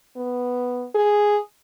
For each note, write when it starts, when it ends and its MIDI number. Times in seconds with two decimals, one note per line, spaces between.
0.17 0.85 59
0.95 1.40 68